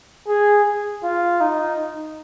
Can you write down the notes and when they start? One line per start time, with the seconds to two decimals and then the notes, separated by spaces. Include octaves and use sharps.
0.28 G#4
1.04 F4
1.41 D#4